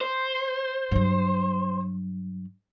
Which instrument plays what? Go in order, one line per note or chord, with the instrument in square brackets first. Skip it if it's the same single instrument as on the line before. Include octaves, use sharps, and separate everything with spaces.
[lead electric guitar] C5
[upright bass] G2 F#3